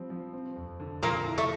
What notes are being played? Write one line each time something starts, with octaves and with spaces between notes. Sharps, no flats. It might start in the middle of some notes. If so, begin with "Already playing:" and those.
Already playing: F3 G3 C4
F3
C4
F2
D3
A#2 F3 A#3
E4
A3